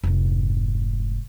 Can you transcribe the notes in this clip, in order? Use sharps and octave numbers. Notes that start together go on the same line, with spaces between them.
F1 G#2